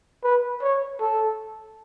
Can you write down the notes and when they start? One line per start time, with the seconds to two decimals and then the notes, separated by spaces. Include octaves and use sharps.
0.24 B4
0.62 C#5
1.00 A4